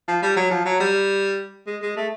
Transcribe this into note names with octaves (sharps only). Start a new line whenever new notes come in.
F3
G3
F#3
F3
F#3
G3
G#3
G#3
A3